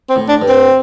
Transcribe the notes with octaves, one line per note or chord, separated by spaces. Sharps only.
C4
A2
D4
G2
C4